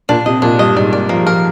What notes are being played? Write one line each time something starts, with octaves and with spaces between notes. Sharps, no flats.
A#2 D4
C3 D#5
A#2 D4
G2 D#5
G#2 D5
A#2 D5
F3 A#3
F3 A#4